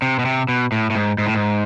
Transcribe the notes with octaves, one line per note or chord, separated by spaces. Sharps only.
C3
B2
C3
B2
A2
A2
G#2
G#2
A2
G#2